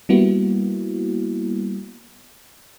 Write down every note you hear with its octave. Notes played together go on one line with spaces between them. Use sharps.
G3 A#3 B3 E4 F#4